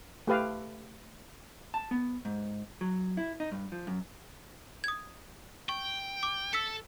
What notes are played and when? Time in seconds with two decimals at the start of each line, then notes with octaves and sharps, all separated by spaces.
0.27 A3 G4 B4 F5
1.74 A5
1.91 B3
2.25 G#2
2.81 F#3
3.17 E4
3.40 D#4
3.52 G2
3.72 F3
3.87 F#2
4.84 D#6 G#6
5.69 G5 C#6
6.23 D6
6.53 A4 E6 B6 C#7